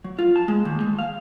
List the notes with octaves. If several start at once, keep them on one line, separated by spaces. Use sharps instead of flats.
F#3
F4
A5
G#3
D#2
G#3
F5